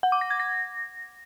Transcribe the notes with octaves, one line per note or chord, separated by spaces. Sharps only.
F#5
D6
A#6
G#6
A#6